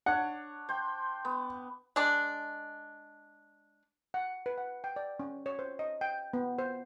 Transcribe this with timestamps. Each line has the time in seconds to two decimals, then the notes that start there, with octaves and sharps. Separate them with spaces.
0.06 D4 C#5 F#5
0.69 C5 G5
1.25 B3
1.96 G#3 D4
4.14 F#5
4.46 B4
4.58 F#5
4.84 G5
4.96 D5
5.20 C#4
5.46 C#5
5.59 C5
5.79 D#5
6.01 G5
6.33 B3
6.59 C5